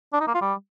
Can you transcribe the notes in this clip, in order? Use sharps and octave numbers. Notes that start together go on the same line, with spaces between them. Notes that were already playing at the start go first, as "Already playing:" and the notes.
D4
D#4
A#3
F4
G3